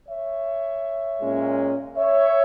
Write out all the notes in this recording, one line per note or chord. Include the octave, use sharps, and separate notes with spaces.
C#5 E5
A#2 G#3 C#4
C#5 E5